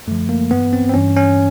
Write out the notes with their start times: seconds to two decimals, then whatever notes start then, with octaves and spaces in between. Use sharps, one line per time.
0.07 F#2 D3 F3 A3
0.29 A#3
0.51 G2 E3 B3
0.73 C4
0.89 C4
0.94 G2 E3 C#4
1.16 C#4